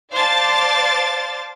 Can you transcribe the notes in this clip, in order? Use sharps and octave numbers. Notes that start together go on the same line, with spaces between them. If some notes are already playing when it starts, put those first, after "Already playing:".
C5 D5 F5 A5 D6 A6